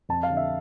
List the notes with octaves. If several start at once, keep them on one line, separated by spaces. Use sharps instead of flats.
F2 A5
F5
D3
E5